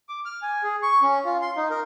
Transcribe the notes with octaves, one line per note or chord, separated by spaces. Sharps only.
D6
F6
G#5
G#4
C#6
C#4
F4
C6
D#4
A#4